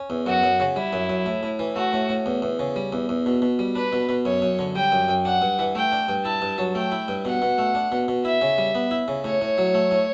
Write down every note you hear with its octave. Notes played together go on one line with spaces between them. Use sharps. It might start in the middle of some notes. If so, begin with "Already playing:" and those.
Already playing: C#4
E2
F#2 F#4
F#2
C#3
G3 E4
F#2
F#2
A2
A2
E3
A3 F#4
A2
A2
E2
E2
C#3
G3
E2
E2
B2
B2
G3
D4 B4
B2
B2
F#2 C#5
F#2
D3
G3 G5
F#2
F#2
D4 F#5
G2
E3
A3 G5
D4
G2
E4 A5
G2
F#3
A3 G5
E4
G2
B2 F#5
B2
A3
D4
B2
B2
E4 E5
C#3
G3
B3
E4
C#3
A2 C#5
A2
F#3
A3
A2